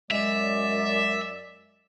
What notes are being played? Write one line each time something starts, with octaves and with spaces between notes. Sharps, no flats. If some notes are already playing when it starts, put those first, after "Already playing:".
F#2 F#3 G#3 D5 E5